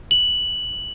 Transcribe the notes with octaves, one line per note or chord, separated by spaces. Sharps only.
F#7